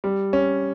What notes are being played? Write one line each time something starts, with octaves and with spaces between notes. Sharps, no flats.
G3
C#4